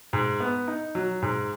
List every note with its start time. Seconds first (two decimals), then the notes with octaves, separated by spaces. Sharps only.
0.13 G#2
0.40 B3
0.68 D#4
0.95 F#3
1.22 G#2